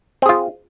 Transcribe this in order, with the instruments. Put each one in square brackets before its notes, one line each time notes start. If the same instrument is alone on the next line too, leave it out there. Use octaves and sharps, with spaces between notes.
[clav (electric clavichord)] C4
G#4
F4